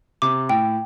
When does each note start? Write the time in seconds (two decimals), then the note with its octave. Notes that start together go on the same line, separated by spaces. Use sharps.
0.22 C3 D6
0.49 A2 G5